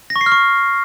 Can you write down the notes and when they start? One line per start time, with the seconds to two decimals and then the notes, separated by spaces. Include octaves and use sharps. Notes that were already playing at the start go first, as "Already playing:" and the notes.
0.10 A#6
0.16 C#6
0.21 C7
0.26 F6
0.32 C#6